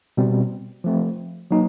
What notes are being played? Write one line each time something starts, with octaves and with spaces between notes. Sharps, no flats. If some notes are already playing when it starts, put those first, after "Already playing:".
B2 G3 C4
F3 A3 C4
F#3 A#3 D#4